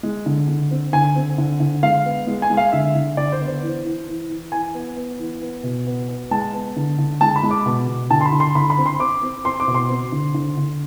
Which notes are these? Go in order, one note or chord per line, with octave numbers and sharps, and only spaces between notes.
G#3
D3
D3
C4
D3 G#5
C4
D3
D3
G#3 F5
B3
G#3
G#5
G#3
F5
D3 E5
D3
D3 D5
C5
B3
C5
E3
E3
E3
E3
E3 G#5
B3
B3
E3
B3
B2
B3
B3
G#3 A5
B3
D3
D3
G#3 A5
B5
G#3
D6
B2
B2
D3 A5
C6
B5
D3
C6
D3 B5
B5
C4
C6
C4 D6
C4
C4 C6
D6
B2
C6
C4
D3
D3
D3